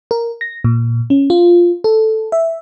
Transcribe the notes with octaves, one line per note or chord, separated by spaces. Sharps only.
A#4
A#6
A#2
C#4
F4
A4
E5